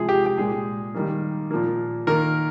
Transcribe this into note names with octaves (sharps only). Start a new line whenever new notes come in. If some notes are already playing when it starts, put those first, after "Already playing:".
Already playing: C3 F3 G#3 G#4
G4
G4
A#2 G#3 G#4
D#3 G3 A#3
A#2 F3 A#3
D#3 A#3 A#4